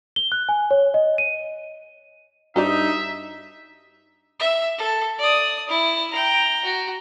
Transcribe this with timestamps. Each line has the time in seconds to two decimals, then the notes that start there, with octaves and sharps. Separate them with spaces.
0.16 G7
0.32 F#6
0.49 G#5
0.71 C#5
0.94 D#5
1.18 D#7
2.56 G2 D#4 F#4 C5 D5 E5
4.40 E5
4.78 A4
5.18 D5 D#6
5.69 E4
6.11 G5 A#5
6.64 F#4